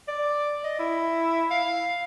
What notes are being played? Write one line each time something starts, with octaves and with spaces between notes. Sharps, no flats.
D5
D#5
E4
F5